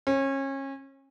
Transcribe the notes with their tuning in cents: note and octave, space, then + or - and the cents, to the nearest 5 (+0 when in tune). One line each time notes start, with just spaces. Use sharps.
C#4 -30